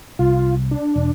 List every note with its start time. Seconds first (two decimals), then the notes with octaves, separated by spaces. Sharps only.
0.19 C2 F4
0.71 D4
0.96 E1